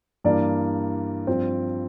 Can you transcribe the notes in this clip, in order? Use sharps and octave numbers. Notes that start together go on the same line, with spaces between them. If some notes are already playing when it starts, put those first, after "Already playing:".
G2 E3 A#3 D5
G2 F3 C4